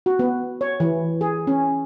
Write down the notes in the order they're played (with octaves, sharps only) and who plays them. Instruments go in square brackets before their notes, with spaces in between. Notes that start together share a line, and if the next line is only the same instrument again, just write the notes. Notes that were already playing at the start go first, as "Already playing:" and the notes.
[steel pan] F#4
B3
C#5
E3
G#4
C#4